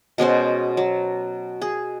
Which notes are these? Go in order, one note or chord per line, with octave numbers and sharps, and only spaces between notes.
B2 G#3 C#4 C5
F#3
G#4